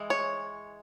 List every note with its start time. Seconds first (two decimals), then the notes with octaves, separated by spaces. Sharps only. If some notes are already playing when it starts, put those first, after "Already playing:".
Already playing: E3 G#3
0.10 C#5